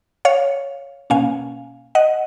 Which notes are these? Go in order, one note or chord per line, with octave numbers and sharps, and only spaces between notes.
C#5 F5
B2 A#3 C#4 F5 G#5
D#5 F#5